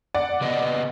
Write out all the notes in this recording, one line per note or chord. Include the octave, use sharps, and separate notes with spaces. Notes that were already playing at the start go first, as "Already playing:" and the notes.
D5 F#5
C#3 B3 D#5